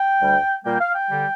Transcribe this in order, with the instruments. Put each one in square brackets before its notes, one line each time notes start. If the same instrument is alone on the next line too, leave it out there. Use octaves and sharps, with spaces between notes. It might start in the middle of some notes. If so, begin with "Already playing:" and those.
Already playing: [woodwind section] G5
D2 D3 G3
A#2 G3 A#3 G5
F5
G5
D3 G3